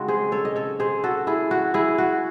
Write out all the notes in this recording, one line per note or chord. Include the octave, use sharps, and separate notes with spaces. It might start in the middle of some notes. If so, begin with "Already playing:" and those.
Already playing: C#3 G#3 C4 D#4 F#4
G#4 C5
A4 C#5
D#5
A4 C#5
G#4 C5
F#4 A4
E4 G#4
F#4
E4 G#4
F#4